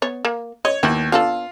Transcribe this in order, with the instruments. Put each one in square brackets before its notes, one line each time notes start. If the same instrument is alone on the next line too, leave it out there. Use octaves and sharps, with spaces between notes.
[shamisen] B3 C#5
A#3
[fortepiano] C#5 [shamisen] D#5
[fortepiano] D#2 [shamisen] B3 E4 F#4
[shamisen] B3 D4 A4 [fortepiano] F4